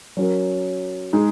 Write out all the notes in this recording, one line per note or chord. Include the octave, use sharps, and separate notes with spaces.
F#3 C#4 F#4 A#4
G#3 D#4 G#4